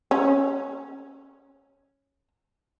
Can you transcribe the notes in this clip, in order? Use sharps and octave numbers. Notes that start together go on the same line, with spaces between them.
C#4